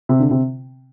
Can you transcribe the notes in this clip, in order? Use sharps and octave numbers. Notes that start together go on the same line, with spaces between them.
C3
D3
C3